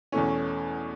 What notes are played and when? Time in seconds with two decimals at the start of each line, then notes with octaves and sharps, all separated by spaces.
0.12 E2 B2 A3 C#4